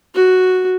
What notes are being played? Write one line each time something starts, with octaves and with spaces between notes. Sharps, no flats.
F#4